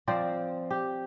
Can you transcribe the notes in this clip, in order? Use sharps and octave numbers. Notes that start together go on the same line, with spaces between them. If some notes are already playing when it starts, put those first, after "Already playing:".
F3 C4 C5 D5
G4